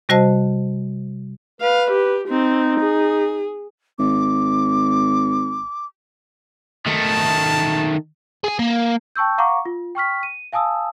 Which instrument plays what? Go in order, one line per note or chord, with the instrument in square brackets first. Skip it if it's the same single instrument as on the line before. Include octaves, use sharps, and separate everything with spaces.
[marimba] C3 G3 F#4 C5 D#5 A5
[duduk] B4 [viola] F5
[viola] G4
[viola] C4 [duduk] D#4
[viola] G#4
[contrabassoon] G#1 [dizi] D6
[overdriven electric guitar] D#3 A3 [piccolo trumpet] A5
[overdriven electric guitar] G#4 G#5
A#3
[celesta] G5 A5 C#6 E6 G6
F5 F#5 A#5 C#6 D6
F4
G5 C#6 F6 B6
D#7
F5 G#5 A5 D#6 E6